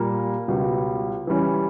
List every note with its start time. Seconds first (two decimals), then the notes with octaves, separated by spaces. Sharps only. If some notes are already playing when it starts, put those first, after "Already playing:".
Already playing: A#2 G3 A#3
0.48 C#2 B2 G3
1.27 E3 G3 C#4